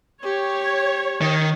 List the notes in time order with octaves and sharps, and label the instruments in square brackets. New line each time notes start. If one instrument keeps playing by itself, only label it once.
[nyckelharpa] G4 [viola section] C#5
[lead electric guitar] D#3